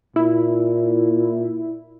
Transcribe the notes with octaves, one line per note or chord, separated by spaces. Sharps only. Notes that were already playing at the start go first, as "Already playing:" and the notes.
A#2 E4